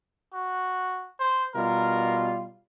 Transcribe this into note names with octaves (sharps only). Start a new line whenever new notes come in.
F#4
C5
B2 G3 F4 A#4